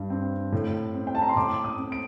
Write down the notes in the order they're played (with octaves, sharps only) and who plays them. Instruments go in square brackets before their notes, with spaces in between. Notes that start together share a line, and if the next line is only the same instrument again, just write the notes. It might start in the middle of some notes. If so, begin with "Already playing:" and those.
Already playing: [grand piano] G2
C4
A2
C4
G5
A5
A#5
C6
A2 D6
D#6
C4
D7